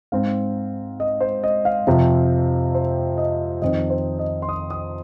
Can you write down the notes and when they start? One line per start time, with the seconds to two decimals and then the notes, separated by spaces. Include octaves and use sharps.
0.12 G#2 G#3 C4 F5
1.00 D#5
1.21 C5
1.44 D#5
1.65 F5
1.87 F2 C3 F3 C4
2.74 C5
3.18 D#5
3.62 F2 D#3 C4 D#5
3.90 C5
4.19 D#5
4.42 C6
4.49 D#6
4.71 D#6